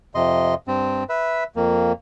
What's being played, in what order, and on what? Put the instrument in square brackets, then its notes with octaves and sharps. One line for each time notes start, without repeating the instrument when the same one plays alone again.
[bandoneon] F2 C3 D#5 C6
G2 C4
B4 E5
F2 A#3